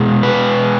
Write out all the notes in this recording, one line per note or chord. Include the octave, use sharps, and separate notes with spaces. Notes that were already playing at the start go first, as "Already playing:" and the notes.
Already playing: B2 G#3
B4